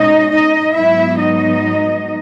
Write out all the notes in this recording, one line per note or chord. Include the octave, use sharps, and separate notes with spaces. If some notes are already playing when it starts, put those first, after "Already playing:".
Already playing: B2 G#3 C#4 D#4 D#5
D#4 D#5
G#2 F#3 B3 E4 E5
D#4 D#5